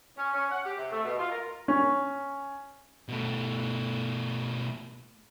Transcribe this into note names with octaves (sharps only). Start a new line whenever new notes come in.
C#4
C#4
F#5
G4
C3
A3
B2
F4
A#4
C#4
B2 A3